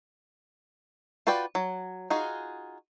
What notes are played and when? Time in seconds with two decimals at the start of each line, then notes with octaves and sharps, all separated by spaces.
1.27 F4 F#4 B4 D5 G5
1.55 F#3
2.10 D#4 F4 F#4 G#4